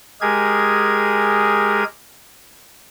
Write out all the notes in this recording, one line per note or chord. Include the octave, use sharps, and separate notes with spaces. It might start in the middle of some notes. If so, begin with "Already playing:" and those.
G#3 G4 G#4 A#4 G#6